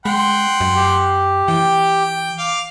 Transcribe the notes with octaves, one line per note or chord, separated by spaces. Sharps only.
G#3 F#5 G5 C6
F#2
G4
E3 G5
F5 D6